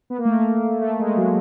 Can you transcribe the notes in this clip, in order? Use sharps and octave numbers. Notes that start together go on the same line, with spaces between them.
B3
A#3
A3
A#3
A3
G#3
F#3